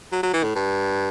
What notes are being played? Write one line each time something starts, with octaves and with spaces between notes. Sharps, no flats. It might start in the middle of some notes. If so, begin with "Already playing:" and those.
F#3
F#3
E3
A2
G2